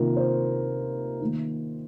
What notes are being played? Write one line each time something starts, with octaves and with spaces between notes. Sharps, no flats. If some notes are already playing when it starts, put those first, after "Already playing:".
Already playing: C3 D#3 A#3 F4 A#4
C5
D#3 A#3